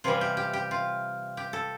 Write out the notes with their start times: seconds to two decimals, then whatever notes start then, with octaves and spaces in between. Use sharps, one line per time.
0.04 C3 E3 G3 F4
0.21 G4
0.37 G4
0.53 G4
0.71 F4
1.37 G4
1.53 A4